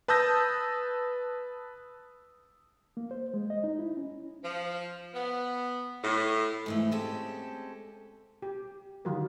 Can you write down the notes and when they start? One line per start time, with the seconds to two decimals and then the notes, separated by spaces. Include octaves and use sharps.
0.08 B4 A5 D#6 E6 G6 A#6
2.97 A#3
3.11 C5
3.34 G#3
3.50 D#5
3.64 D#4
3.79 E4
3.97 C#4
4.44 F3
5.14 B3
6.04 A2
6.66 G#2 E3 A3
6.91 G#3 C4 C#4 G4 A4
8.42 G4
9.05 D3 D#3 F#3 F4 G4 A#4